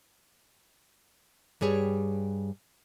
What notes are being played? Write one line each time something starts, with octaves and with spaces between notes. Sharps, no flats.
G2 G3 G#4 C#5